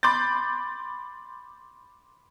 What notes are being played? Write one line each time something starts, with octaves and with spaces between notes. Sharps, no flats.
B5 C6 D6 G6 A6